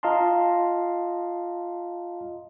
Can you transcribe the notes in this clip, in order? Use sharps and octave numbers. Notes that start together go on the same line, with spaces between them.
F4 D#5 F5 A5 A#5 C6